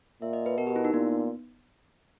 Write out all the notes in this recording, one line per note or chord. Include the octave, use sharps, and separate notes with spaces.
A#2 E5
D#5
B4
B2 A#4
G4
E4
D#4
A#2 B3